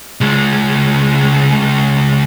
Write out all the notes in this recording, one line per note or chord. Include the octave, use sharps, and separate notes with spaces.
C#2 G#3